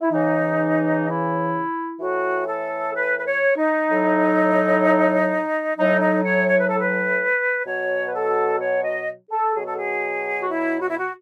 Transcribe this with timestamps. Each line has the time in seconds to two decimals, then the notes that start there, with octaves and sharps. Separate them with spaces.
0.02 E4
0.11 C#3 E3 D#4
1.06 E4
2.00 A2 E3 F#4
2.48 A4
2.95 B4
3.19 B4
3.26 C#5
3.57 D#4
3.89 A2 F#3
5.77 A2 F#3 D#4
6.01 D#4
6.25 C#5
6.48 C#5
6.59 B4
6.69 A4
6.80 B4
7.66 B2 F#3 C#5
8.07 B4
8.14 A4
8.60 C#5
8.84 D#5
9.31 A4
9.55 B2 F#3 G#4
9.66 A4
9.78 G#4
10.42 F#4
10.49 E4
10.80 F#4
10.90 E4
10.98 F#4